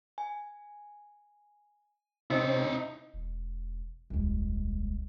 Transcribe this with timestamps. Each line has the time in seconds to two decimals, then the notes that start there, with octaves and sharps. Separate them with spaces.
0.18 G#5
2.30 C3 C4 C#4 D#4 E4 D#5
3.14 E1
4.10 D#1 C2 G#3